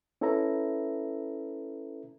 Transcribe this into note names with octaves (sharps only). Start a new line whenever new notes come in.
C#4 E4 A4 B4 E5 A#5